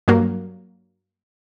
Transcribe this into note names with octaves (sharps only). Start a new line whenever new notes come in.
G2 F#3 A#3